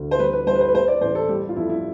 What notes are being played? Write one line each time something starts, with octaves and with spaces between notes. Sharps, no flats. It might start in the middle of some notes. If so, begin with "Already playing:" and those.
Already playing: D2
C5
G3 B4
B4
G3 C5
B4
C5
B4
G3 C5
D5
A1 C5
A4
G3 G4
F4
F2 E4
E4